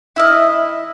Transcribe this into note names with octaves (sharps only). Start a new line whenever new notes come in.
E4 D#5 E5 E6 F6